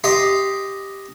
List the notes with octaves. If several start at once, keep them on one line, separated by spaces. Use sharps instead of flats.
G4 D#5 C6